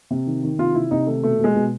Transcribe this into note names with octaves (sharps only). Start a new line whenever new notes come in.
C3
D#3
D#3
C3 F4
C3 E4
C3 D#4
D#3 A3
B2 A3
B2 G#3
B2